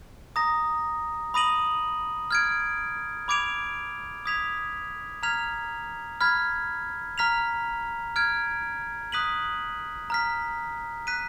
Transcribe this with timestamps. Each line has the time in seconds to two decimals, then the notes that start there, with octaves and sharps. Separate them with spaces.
0.36 A#5 D#6 A#6
1.34 B5 D#6 A#6 D#7 F#7
2.31 F6 G#6 D7
3.28 B5 D6 G#6 D7 F7
4.26 D#6 G#6 B6 F7
5.23 A#5 F6 G#6 B6 F7
6.21 B5 F6 G#6 B6
7.18 A#5 F6 B6 F7
8.16 F6 G#6 D7
9.12 D#6 F#6 B6 D#7 F#7
10.10 A#5 F6 B6
11.07 F#6 B6 D#7